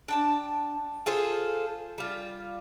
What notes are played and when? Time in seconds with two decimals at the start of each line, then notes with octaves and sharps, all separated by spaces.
0.08 D4 G5 A5
1.06 F4 G#4 A4 C5
1.98 G3 F4